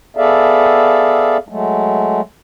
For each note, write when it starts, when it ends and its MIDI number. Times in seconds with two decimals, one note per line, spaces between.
0.17 1.37 59
0.17 1.37 68
0.17 1.37 69
0.17 1.37 74
0.17 1.37 76
0.17 1.37 77
1.49 2.21 54
1.49 2.21 56
1.49 2.21 57